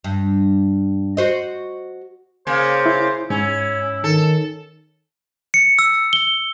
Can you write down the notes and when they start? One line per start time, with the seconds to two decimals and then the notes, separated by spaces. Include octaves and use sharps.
0.04 G2
1.17 F#4 C5 D#5
2.47 C#3 A#3 C5
2.86 E4
3.30 G#2 C#4 E4
4.04 D#3 A4
5.54 C#7
5.79 E6
6.13 G7